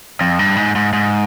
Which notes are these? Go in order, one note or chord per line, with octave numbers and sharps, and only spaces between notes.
F2
G2
G#2
G#2
G#2